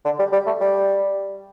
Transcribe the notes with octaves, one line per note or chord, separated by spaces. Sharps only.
D3
G3
G3
A3
G3